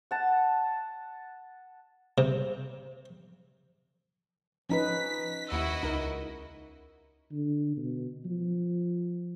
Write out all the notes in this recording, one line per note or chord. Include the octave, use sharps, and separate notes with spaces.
F#5 A5
C3
F3 C#4 D#4 B4 B6
D#2 E4 F#4 D#5 E6
C#2 D#4 A#4
D3
B2
F3